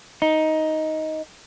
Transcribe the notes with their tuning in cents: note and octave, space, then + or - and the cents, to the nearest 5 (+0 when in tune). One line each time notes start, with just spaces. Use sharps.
D#4 +10